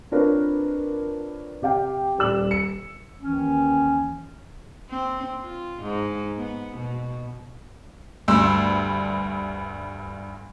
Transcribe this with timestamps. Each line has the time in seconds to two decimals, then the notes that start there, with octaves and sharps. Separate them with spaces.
0.11 C4 D4 F4 A#4 B4 C#5
1.62 C3 G4 F5 G5
2.18 D#1 G3 E6 F#7
2.51 C#7
3.21 D#2 D#3 E3 C#4
4.90 C4
5.42 F4
5.83 G#2
6.38 B3
6.77 B2
8.28 D2 G2 C6 E6